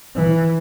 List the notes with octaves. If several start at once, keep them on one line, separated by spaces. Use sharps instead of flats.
E3